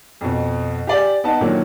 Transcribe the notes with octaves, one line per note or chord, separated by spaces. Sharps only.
F2 B2
G4 D5 G#5
B3 D#4 A5
A#2 D3 D#3 F3 F#3 A#3